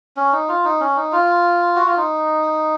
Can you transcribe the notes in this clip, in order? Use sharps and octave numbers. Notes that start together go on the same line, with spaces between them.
C#4
D#4
F4
D#4
C#4
D#4
F4
F#4
F4
D#4